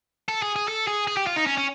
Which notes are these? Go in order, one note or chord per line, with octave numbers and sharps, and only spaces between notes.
A4
G#4
G#4
A4
G#4
G#4
G4
F4
D#4
C#4
C#4